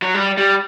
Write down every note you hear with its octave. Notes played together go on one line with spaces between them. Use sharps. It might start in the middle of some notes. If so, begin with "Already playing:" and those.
F#3
G3
G3